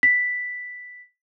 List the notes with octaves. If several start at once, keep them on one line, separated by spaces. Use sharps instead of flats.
B6